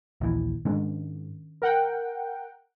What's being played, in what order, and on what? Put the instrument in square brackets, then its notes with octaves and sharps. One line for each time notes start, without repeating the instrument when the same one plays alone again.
[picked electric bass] A#1 D#2 E3
[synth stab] G#2 [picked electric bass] D#3 C#4 D4
[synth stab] A#4 F#5 G5